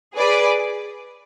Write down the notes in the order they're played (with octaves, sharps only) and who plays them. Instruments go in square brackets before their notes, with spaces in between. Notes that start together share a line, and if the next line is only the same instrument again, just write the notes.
[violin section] G#4 B4 D5